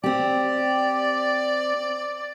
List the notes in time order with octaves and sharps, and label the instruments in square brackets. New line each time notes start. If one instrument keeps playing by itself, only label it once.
[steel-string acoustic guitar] C4 G4 [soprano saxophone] D5